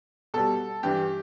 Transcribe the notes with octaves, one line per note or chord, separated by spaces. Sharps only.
B2 G3 A4
G2 E3 G3 G4